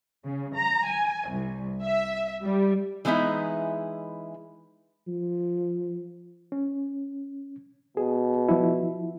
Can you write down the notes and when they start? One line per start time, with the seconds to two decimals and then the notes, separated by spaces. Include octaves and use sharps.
0.24 C#3
0.56 A#5
0.87 G#5
1.29 C2
1.83 E5
2.44 G3
3.05 E3 G#3 B3 D#4 E4
5.08 F3
6.52 C#4
7.97 B2 G#4
8.49 F3 E4